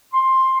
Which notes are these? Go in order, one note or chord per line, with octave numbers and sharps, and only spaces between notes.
C6